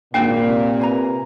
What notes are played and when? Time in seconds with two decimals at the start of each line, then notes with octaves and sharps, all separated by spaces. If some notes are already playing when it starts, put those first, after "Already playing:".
0.14 G#1 A#2 A#3 D4 G5
0.44 C3
0.79 B4 G#5 A#5